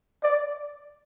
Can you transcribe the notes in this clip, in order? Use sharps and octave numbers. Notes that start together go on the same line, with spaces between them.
D5